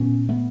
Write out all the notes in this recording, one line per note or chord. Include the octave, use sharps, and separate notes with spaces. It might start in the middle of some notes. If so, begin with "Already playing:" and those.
Already playing: A#2 B3 C#4
A3 B3